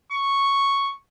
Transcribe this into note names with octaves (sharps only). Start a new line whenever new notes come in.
C#6